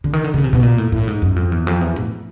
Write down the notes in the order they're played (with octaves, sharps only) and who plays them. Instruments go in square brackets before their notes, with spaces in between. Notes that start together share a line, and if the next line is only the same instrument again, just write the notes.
[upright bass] D3
D#3
D3
C#3
C3
B2
A#2
A2
A2
G#2
F#2
F2
E2
F2
E2
A2